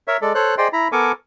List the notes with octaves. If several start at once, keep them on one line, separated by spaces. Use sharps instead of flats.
A#4 C#5 E5
G#3 A4 D5
A4 C5 C#5 F#6
G#4 C5 D5 D#5 G5 C6
E4 A#5 B5
B3 A4 A#4 G#5 C#6 D6